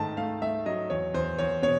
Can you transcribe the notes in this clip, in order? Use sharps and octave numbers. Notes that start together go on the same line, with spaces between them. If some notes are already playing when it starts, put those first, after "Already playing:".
Already playing: G#2 D#3 A3 A5
A3 F5
A3 E5
F#3 D#5
E2 C#5
E2 C5
E2 C#5
B2 C#5